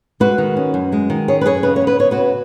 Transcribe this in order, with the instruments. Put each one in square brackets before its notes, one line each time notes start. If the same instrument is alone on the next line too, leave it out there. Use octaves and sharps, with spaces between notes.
[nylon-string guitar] G#3 F#4 B4
D#3
C#4
F#2
G#3
D#3
C#4 G#4 C#5
B4
F#2 G#4 C#5
C#3 B4
C#5
B3
B4
B3 C#5
F#4 B4
C#3